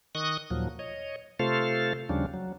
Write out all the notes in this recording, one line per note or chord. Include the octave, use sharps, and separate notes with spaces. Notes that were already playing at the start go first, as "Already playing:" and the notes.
D#3 D#5 C#6 D#6 F#6
D#2 A#2 F3 F#3
C#5 D#5
C3 A3 F4 A4 C5 F5
D#2 C#3 F3 G3 C#4 D4
F#3